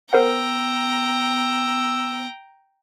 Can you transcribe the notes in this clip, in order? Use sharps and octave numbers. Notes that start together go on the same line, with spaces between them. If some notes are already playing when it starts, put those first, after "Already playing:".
B3 A#4 C5 F#5 G5 A#5 E6